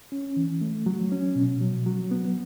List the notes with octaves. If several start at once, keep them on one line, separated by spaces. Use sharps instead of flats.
C#4
E3
A3
F#3
C#4
B2
F#3
F#3
B3